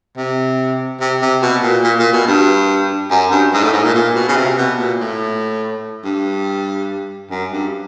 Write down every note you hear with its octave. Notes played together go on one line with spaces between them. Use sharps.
C3
C3
C3
B2
A#2
A#2
A#2
B2
G2
F#2
G2
G#2
A2
G#2
A#2
A#2
B2
C#3
C3
B2
A#2
A2
G2
F#2
G2